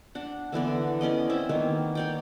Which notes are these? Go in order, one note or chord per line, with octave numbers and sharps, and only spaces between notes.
D4 F#5
D3 E3 B3 D5
B3 C#4 D5 D#5
C4 E4
D#3 A#3 B3 C#5
C#5 D5 G5